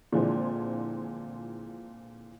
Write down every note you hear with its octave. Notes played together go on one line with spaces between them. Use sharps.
A#2 D3 E3 F3 G#3 C4